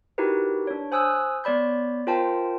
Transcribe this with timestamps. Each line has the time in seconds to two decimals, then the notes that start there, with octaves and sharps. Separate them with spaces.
0.18 D#4 E4 F#4 G4 A#4 B4
0.67 D4 C#5
0.92 C5 G#5 D#6 E6 F#6
1.44 B3 C#5 D5 B5 G6
2.07 F4 A#4 C5 G5 A5